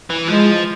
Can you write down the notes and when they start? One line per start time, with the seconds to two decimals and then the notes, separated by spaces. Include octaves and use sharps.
0.10 E3
0.28 F3 G#3